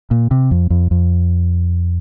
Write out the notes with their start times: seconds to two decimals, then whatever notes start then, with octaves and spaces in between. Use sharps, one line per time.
0.11 A#2
0.31 C3
0.51 F2
0.70 F2
0.91 F2